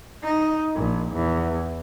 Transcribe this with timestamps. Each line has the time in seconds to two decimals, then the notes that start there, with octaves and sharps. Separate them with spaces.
0.24 D#4
0.75 A#1
1.14 E2